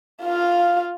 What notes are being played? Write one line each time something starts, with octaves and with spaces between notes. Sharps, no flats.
F4 F5